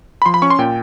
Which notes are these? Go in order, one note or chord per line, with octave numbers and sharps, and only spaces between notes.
B5
F3 C6
B5
C#4 C#6
C6
A#2 G5